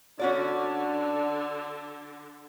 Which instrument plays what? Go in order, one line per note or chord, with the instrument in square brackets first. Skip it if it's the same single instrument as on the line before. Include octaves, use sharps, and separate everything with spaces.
[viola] D3 [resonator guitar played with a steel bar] C#4 F#4 D5 [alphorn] D4